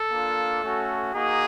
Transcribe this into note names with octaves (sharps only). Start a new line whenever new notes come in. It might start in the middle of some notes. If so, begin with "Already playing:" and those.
Already playing: A4
A#3 D4 F4
A3 C#4 F#4
A#3 D#4 F#4 G#4